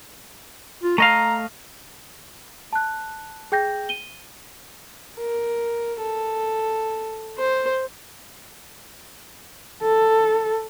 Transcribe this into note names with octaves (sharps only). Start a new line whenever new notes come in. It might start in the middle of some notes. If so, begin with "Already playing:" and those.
F4
A3 D#5 F5 A#5
A5 F#6
G#4 G5 G6 A#6
D#7 G7
A#4
A4
C5
A4